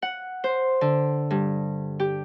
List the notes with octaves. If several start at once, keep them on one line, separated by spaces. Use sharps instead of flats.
F#5
C5
D3
G2
G4